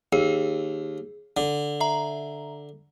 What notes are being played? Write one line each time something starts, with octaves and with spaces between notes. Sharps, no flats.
D#2 G#4
D3
E5 A#5